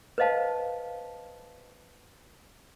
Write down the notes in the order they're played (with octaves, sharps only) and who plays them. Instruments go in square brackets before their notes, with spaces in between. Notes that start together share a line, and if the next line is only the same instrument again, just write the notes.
[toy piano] B4 C5 D#5 F5 A5